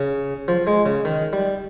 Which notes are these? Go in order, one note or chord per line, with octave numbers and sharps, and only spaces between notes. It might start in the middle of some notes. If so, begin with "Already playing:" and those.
Already playing: C#3
F3
G#3
C#3
D#3
G3